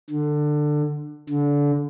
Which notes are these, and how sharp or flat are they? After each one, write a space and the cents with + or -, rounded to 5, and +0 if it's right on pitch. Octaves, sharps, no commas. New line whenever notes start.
D3 +20
D3 -25